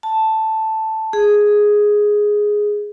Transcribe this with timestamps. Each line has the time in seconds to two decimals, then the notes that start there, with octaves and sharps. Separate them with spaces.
0.03 A5
1.13 G#4